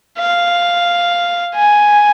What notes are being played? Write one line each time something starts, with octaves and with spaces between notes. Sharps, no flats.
F5
G#5